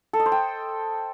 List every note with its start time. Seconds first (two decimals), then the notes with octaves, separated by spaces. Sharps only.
0.13 A4
0.20 D#5
0.26 C5
0.32 G5